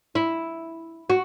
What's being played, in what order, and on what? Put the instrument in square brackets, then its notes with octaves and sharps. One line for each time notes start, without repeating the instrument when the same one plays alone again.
[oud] E4
F#4